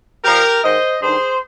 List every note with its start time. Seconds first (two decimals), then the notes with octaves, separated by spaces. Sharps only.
0.24 A#2 F3 G4 A#4
0.63 G#2 D#3 C5 D#5
1.02 G2 D#3 G#4 C5